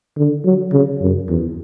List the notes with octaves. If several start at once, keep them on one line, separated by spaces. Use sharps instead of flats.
D3
F#3
C#3
F#2
E2